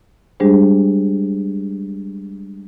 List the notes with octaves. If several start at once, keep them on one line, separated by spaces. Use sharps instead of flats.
G3 G#3 D4 G4 G#4 C5